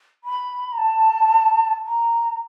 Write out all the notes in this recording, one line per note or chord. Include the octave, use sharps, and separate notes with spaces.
B5
A#5
A5
A#5